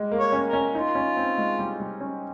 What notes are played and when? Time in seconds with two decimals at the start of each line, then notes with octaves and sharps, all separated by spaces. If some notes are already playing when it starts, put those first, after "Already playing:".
Already playing: G3 G#3
0.12 A#3
0.18 C#5
0.32 C#4
0.47 A#4
0.53 C#4
0.74 D#4 F4
0.95 C#4
1.17 C4
1.38 G#3
1.59 G3
1.80 G3
2.01 C#4